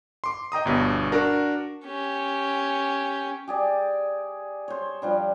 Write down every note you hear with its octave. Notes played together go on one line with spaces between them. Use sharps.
C6 D6
D#5 G5 A#5 D#6
G1 G2 B2
D4 F#4 A#4
C#4 G4
G4 G#4 D5
C5 C#5
F3 G3 D4